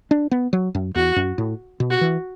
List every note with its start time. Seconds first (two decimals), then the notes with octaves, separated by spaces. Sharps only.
0.11 D4
0.31 B3
0.53 F#3
0.75 F#2
0.95 E2 F#4
1.16 F#2
1.38 A2
1.80 B2
1.90 F#4
2.01 E3